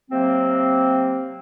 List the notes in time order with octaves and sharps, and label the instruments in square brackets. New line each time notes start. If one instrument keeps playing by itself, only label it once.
[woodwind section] C3 F#3 A#3 C4